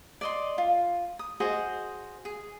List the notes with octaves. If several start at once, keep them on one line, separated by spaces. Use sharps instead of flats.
D5 D#5 C6
F4
D#6
F#4 G#4 C5 D#5
G#4